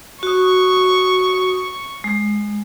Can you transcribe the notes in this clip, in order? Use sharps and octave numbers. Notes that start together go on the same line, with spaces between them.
F#4 C#6 D#6
G#3